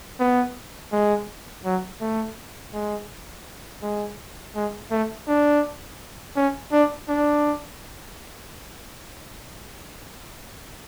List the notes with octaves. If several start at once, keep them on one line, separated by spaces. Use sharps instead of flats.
B3
G#3
F#3
A3
G#3
G#3
G#3
A3
D4
C#4
D4
D4